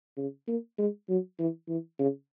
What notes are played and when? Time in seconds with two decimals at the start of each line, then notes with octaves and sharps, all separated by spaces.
0.17 C#3
0.47 A#3
0.78 G#3
1.09 F#3
1.39 E3
1.68 E3
1.99 C#3